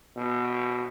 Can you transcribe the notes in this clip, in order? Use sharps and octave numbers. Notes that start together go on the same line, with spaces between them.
B2